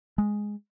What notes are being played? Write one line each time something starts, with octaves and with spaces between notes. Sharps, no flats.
G#3